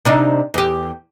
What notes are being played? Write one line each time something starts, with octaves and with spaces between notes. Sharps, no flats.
C3 D4 D#4
E2 G4